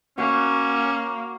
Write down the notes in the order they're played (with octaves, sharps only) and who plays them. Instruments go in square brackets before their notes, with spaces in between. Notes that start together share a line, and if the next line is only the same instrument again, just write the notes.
[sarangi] A#3 [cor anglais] C#4 [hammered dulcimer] F#4